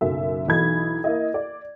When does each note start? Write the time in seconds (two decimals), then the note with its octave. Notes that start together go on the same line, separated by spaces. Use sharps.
0.01 F#1 B1 F#2 E5
0.48 B1 E3 D#4 B5 G#6
1.04 A#3 E4 D#5
1.34 D5